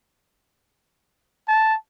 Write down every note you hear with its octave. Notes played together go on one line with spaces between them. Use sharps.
A5